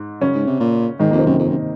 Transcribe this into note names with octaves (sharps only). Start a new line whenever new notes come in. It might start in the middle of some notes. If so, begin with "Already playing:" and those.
Already playing: G#2
F#2 C#3 C#4
G#2
C3
A#2
G#2 D#3 D#4
F2 A#3
C3 C4
F#2
F2
F#2